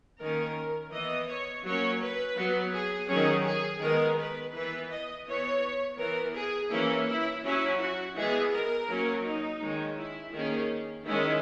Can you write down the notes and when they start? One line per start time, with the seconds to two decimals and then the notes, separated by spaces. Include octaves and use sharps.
0.20 D#3 A#3 C#4 A#4
0.92 E3 B3 D#5
1.28 C#5
1.64 F#3 A#3 C#4 C#5
2.01 B4
2.37 F#3 B3
2.73 G#4
3.09 D#3 F#3 C#4 G#4
3.45 G#4
3.81 D#3 G#3 B3 A#4
4.18 B4
4.54 E3 B3 B4
4.90 D#5
5.27 E3 B3 C#5
5.99 E3 B3 A#4
6.34 G#4
6.71 E3 A#3 C#4 E4
7.08 E4
7.44 F#3 C#4 E4
7.80 F#4
8.16 E3 G#3 B3 G#4
8.52 A#4
8.88 F#3 A#3 C#4
9.25 D#4
9.61 D#3 G#3 C#4
9.97 E4
10.33 D#3 A#3 C#4 G#4
11.06 D#3 G#3 C#4 E4